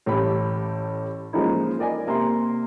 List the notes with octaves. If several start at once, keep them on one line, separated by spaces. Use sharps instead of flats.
A1 A3 G4 B5
F3 G#3 A#3 C#4 D#4 E4
A#4 D5 D#5 G#5
C3 A#3 E5 C6